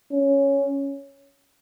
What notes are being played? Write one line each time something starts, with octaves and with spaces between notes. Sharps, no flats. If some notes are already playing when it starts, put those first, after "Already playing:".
C#4